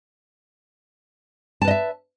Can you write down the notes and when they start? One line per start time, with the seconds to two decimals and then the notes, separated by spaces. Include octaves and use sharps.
1.62 A5
1.65 B4
1.68 D#5
1.71 E5